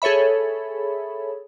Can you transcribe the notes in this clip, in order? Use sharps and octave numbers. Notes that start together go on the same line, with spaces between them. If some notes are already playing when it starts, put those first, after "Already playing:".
G#4 A4 C#5 E5 B5